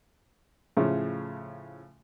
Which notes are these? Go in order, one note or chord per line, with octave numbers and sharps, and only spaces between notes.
A2 C#3 F3 A3